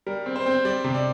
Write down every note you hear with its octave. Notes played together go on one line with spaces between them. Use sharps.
G3 A#4
C4
C5
C4
G3 D5
C3
D5